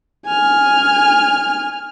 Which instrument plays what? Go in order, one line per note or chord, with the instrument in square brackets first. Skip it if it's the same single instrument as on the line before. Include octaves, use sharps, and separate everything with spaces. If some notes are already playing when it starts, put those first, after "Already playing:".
[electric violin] G#5 F6